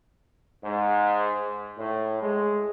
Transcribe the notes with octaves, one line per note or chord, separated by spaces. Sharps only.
G#2
A2
G#3